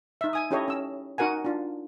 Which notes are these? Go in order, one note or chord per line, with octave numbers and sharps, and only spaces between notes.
D#4 E5
G#5 D#6
C#4 E4 G4 A4 C#5 D#5
C#4 E6
D#4 F#4 A#4 F#5 G#5
D4 F4